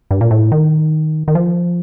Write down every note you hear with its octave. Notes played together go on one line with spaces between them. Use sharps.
G2
A#2
A2
D#3
D#3
F3